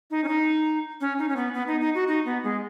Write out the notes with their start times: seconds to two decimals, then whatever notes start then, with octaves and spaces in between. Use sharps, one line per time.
0.11 D#4
0.24 C#4
0.28 D#4
1.01 C#4
1.19 D#4
1.29 C#4
1.36 B3
1.54 B3
1.67 D#4
1.81 D#4
1.95 F#4
2.07 D#4
2.25 B3
2.44 G#3